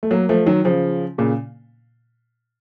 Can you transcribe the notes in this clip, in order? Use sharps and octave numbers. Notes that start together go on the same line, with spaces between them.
A3
F#3 A#3
F3 A3
D#3 F#3
C#3 F3
A#2 C#3